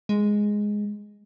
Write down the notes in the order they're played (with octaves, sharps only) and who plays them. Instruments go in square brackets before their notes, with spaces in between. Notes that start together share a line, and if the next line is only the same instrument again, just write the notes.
[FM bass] G#3